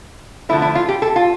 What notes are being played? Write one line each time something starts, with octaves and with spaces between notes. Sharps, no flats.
D3 F3 A3 E4
E4
F4
G4
A4
F4